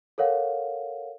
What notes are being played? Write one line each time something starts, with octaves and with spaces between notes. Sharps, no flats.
A4 A#4 C#5 F5 F#5